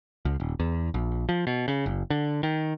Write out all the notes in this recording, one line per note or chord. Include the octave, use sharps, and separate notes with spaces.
C#2
D#1
E2
A#1
F3
B2
C#3
F#1
D3
D#3